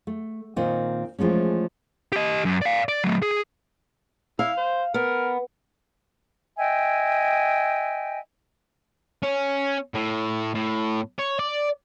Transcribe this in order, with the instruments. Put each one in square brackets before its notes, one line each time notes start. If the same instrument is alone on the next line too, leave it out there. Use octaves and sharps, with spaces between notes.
[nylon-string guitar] A3
A#2 D#3 C4 D#5
E3 F3 G#3 A3 C#4
[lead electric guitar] G4 D#5
F#2
D5 F5
D5
F#3 A3
G#4
[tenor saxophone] E4 [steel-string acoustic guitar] F5
[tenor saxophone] C5
[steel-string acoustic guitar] B3 [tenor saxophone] A#4
[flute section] D#5 E5 G5 G#5
[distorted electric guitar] C#4
A2
A2
C#5
D5